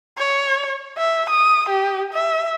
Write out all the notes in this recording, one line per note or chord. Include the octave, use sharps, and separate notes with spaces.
C#5
E5
D#6
G4
E5